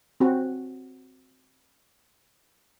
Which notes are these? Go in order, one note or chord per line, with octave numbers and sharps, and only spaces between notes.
C4 F#4